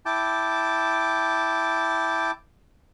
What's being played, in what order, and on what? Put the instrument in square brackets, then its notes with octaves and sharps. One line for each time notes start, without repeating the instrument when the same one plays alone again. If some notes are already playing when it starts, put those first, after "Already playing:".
[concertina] E4 G5 A5 D6